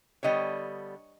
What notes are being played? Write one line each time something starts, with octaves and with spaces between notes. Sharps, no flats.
D3 G3 B3 C#5 D#5